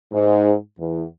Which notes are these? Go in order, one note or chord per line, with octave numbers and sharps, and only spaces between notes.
G#2
E2